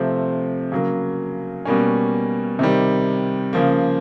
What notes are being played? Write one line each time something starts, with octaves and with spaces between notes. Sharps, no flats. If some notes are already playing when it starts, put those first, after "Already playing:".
Already playing: C3 F3 A3 C4
C#3 F#3 A#3
B2 G3 A#3 C#4
C3 D#3 G3
C#3 F3 A#3